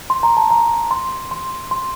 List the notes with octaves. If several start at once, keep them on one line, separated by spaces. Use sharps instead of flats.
C6
A#5
A5
A#5
C6
C6
C6